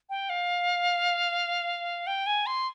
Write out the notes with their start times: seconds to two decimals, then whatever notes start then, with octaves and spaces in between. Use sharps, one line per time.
0.10 G5
0.29 F5
2.07 G5
2.26 G#5
2.46 C6